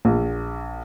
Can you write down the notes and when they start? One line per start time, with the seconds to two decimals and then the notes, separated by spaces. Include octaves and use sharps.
0.05 A#1